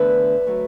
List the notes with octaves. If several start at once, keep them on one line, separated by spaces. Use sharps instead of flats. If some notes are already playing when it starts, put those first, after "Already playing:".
Already playing: E2 D3 A3 B4 E5
F#3 A3